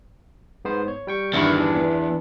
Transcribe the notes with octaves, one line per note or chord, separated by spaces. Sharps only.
G#2 B3 C5
C#5
G3 G5 C#6
E2 G2 D3 D#3 E4 C#6
E3 D4
B3